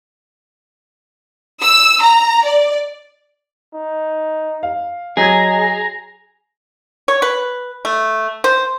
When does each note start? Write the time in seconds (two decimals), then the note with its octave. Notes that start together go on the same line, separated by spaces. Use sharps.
1.61 E6
2.01 A#5
2.44 D5
3.74 D#4
4.63 F5
5.17 F#3 G#4 D#5 A#5 G#6
7.08 C#5
7.22 B4
7.85 A3
8.44 C5